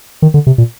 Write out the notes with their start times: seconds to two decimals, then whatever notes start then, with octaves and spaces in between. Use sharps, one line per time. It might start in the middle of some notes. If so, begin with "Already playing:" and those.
0.22 D#3
0.34 D3
0.47 C3
0.58 A#2